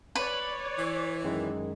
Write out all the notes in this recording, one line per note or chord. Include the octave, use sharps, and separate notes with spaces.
B4 C#5 D5
E3
F#2 D#3 G#3